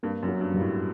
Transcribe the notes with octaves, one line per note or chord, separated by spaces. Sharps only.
G2 A#3
F#2
F#3
G2
G2
A2